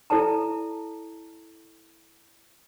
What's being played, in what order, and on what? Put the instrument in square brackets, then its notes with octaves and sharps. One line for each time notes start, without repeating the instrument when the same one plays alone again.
[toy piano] E4 A4 D5 A5 A#5